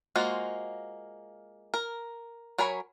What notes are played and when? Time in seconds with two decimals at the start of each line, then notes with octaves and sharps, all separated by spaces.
0.16 G#3 A#3 F4 F#4 C5
1.74 A#4
2.58 F#3 A#4 C#5 G#5 B5